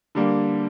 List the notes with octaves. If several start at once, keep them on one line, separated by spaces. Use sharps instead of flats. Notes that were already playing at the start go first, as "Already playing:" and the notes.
D3 G3 A#3